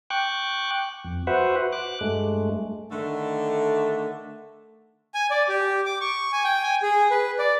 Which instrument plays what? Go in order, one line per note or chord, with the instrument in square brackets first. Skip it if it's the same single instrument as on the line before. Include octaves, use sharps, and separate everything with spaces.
[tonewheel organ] G5 C#6 D6 F#6
F2
F#4 B4 C5 E5 F#5
D6 F#6
G2 G#3 A3
[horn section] D3 D#3 A3
[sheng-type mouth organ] G#5
D5
G4
D6
C#6
G#5
G5
G#5
G#4
B4
D5